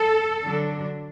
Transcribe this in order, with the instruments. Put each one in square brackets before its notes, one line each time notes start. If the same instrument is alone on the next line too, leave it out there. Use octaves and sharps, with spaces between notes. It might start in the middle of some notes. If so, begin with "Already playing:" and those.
Already playing: [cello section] A4
D3 F#3 D4